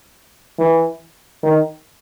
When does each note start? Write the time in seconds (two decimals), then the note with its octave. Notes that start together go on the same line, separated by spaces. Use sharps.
0.59 E3
1.43 D#3